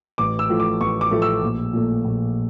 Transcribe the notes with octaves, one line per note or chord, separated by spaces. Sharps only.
A1 D6
E6
A2 F3 A3
D6
A1 C#6
D6
A2 F3 A3
E6
A#1
A#2 A3
A#1